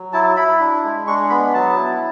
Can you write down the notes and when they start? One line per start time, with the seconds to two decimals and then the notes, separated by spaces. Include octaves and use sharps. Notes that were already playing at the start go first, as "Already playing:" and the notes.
Already playing: F#3
0.13 E4 A5
0.36 E4 B5
0.60 D4
0.84 G#3
1.07 D4 C#6
1.30 B3 B5
1.54 F#3 A5
1.77 E4